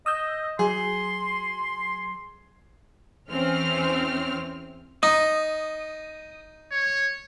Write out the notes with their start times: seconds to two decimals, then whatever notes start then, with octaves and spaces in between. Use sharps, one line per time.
0.06 D#5 D#6 E6 G6
0.59 F#3 G#4 C6
3.31 E2 E3 C4 C#4 F6
5.03 D#4 D#6
6.72 C#5